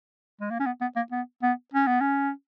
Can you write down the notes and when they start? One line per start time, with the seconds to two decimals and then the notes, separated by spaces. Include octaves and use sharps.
0.41 G#3
0.51 A#3
0.60 C#4
0.66 B3
0.81 B3
0.96 A#3
1.12 B3
1.43 B3
1.74 C#4
1.87 B3
2.01 C#4